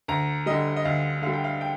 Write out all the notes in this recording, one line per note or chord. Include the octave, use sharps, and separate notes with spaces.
D2 A#5
D3 G3 D#5
D#5
D2 F5
D3 G3 F5
G5
F5
G5